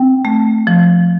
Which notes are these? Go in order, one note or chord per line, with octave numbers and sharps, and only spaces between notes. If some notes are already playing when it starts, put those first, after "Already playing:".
Already playing: C4 G5
A3
F3